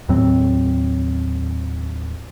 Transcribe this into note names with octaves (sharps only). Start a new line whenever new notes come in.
D#2 A2 F#3 C4